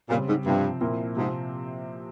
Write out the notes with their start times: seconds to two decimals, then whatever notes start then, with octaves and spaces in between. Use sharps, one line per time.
0.09 A#2 C#3 G3 C4
0.28 G#2
0.45 G2 C3 F3 C4
0.81 A#2 F3 C4 E4 A#4
1.17 G#2 C3 F3 C4